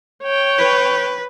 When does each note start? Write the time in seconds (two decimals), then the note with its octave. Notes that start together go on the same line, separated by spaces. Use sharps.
0.24 C#5 G5
0.58 B4